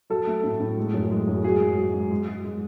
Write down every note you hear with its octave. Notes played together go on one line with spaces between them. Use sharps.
F#3 A4
A3
A2
A2
G#3
F#2
G#3
F#2
F#3 G#4
G#2
F#3
G#2
G#3
G#3
G#3